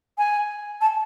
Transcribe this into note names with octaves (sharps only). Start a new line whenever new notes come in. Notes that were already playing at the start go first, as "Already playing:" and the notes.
G#5
A5